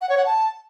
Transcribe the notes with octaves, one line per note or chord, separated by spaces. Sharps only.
F#5
C#5
F#5
A5